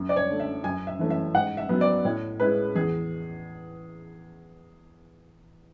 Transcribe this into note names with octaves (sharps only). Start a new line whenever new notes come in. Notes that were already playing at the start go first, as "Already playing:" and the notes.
Already playing: F#2
D5
C#5
D3 A3
E5
F#2 G#5
E5
E3 A3 C#4
E5
G#2 F#5
E5
F#3 B3
D5
A2 C#5
G#3 C#4 E4 B4
E2 G#4